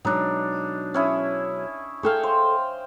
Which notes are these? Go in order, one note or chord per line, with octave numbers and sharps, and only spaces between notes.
B2 F#3 G#3 D4 D#4
C#4 E4 G#4
G#4 A4 F5 G5 C#6
C5